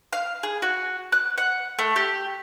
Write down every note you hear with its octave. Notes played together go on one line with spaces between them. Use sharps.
F5
G#4
F#4
F#6
F#5
A3
G4